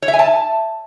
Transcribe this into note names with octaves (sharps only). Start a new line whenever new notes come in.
C#5
E5
G#5
A5